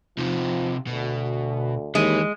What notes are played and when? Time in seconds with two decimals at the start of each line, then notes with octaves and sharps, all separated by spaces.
0.18 C3 F3 D#4
0.87 D2 B2
1.95 D#2 E3 G#3